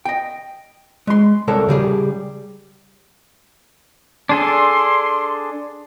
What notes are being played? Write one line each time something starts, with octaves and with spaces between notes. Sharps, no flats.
D#5 G5
G#3 C6
C2 A4 A#4 C#5 A5
C#3 G3 G#4
D4 G#4 A4 C6